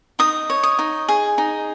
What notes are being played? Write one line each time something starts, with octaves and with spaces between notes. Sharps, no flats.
D#4 D#6
C#5
D#6
D#4
G#4
D#4